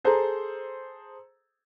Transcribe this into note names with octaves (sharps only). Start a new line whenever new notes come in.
G#4 A4 C5 A#5